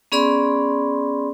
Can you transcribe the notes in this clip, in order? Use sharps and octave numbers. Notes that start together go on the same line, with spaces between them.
B3 C#4 G#4 D5 B5 C6